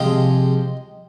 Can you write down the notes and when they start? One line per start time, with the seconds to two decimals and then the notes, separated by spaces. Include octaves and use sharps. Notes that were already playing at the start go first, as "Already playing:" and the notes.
Already playing: C3 F3 G#3 D#5 G5